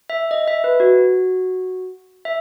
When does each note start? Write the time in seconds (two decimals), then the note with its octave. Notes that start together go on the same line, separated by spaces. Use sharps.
0.10 E5
0.31 D#5
0.48 E5
0.64 B4
0.80 F#4
2.25 E5